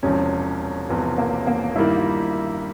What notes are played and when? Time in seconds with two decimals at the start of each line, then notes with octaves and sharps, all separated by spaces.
0.03 E1 E2 C3 F3 C#4
0.89 E1 E2 C3 F3 B3
1.18 A#3
1.47 A#3
1.76 G2 D#3 G3 A#3 E4
1.97 F4